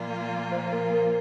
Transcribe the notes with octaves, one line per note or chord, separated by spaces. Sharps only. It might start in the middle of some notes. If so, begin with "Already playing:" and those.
Already playing: A#2 F3 A#3 F4 D5
C5
C5
A#4
A#4